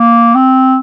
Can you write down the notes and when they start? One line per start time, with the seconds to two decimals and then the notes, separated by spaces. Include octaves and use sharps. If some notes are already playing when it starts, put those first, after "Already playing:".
Already playing: A#3
0.35 C4